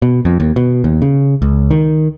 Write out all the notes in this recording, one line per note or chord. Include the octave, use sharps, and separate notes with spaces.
B2
F2
D#2
B2
D#2
C#3
C#2
D#3